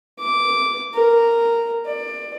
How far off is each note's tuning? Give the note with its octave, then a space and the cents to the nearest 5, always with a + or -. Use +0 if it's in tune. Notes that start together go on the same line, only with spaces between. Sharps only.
D6 -10
A#4 -5
D5 +20